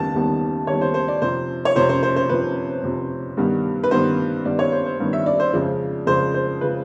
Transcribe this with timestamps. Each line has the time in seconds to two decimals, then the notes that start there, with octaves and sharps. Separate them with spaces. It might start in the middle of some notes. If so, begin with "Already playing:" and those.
Already playing: D#2 D#3 G3 B3 A5
0.14 D#2 D#3 G3 B3
0.67 D#2 D#3 G3 B3 C#5
0.81 C5
0.94 C5
1.08 D5
1.22 F2 C3 F3 C5
1.65 C#5
1.75 F2 C3 F3 C5
1.89 C5
2.03 C5
2.16 C5
2.29 F2 C3 F3 B4
2.84 F2 C3 F3
3.37 G2 D#3 G3 B3
3.84 B4
3.91 G2 D#3 G3 B3 C5
4.45 G2 D#3 G3 B3 D5
4.59 C#5
4.72 C5
4.86 C5
4.99 G2 D#3 G3 B3
5.13 E5
5.26 D5
5.40 C5
5.53 F2 C#3 F3 G#3
6.07 F2 C#3 F3 G#3 C5
6.34 C5
6.61 C#3 F3 G#3 B4